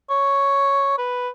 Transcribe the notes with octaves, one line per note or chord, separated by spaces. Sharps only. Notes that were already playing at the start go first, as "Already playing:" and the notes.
C#5
B4